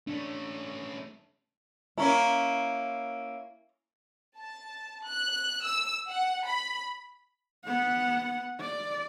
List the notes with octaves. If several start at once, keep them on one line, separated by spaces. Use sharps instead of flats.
A3 C#4 D4
A#3 C#4 E4 A#5
A5
F#6
E6
F#5
B5
B3 F#5
D5